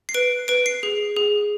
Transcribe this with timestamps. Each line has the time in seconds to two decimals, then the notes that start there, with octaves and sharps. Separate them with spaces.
0.09 C7
0.14 B4 D7
0.48 B4 D7
0.66 C7
0.83 G#4
1.16 G#4